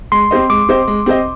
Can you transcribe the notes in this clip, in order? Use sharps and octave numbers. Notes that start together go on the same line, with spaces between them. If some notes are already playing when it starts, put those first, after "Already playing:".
G#3 C6
C4 G4 C5 D#5
G#3 D6
C4 G4 C5 D#5
G#3
C4 G4 C5 D#5